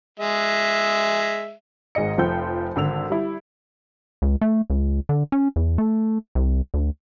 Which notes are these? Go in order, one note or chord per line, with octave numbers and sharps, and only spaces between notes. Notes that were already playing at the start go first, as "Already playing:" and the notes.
G#3 E5
G#1 G#2 G#4 D#5 C#7
F1 F3 C5 G5 G6
G#1 D3 E6 F7
G3 E4
C#2
A3
C#2
D3
C#4
E2
A3
C2
D2